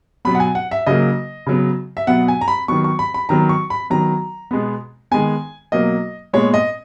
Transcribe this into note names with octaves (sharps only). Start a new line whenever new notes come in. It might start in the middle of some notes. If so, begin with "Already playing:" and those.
B2 F#3 B3 B5
F#5
G#5
F#5
E5
C#3 F#3 A#3 D#5
C#3 F#3 B3
E5
B2 F#3 B3 F#5
G#5
A#5
B5
D#3 F#3 B3 C#6
C#6
B5
B5
D#3 F#3 B3 A#5
C#6
B5
D#3 F#3 B3 A#5
B2 G#3 B3
D#3 G#3 B3 G#5
B2 F#3 A#3 D#5
A#2 G#3 B3 C#5
D#5